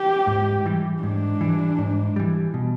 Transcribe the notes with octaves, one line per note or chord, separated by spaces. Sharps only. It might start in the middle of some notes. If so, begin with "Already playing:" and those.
Already playing: G4
G#2
E3 G3
G#2 D4
E3 G3
G#2
E3 G3
B2